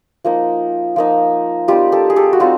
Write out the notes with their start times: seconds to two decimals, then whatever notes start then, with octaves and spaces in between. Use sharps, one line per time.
0.24 F3 A#3 D#4
0.96 F3 A#3 D#4
1.68 G3 C4 D#4 F4 G4
1.92 G4 A4
2.10 G#4
2.16 G4 A4
2.33 F#4
2.40 G3 C4 D#4 F4 G4